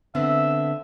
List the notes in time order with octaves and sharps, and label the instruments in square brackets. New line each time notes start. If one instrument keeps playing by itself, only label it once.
[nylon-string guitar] D3 B3 C4 [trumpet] E5